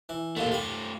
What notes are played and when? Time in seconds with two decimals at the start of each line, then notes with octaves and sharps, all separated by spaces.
0.09 E3
0.36 D#2 A#2 D3 A3 F4
0.52 G3 B5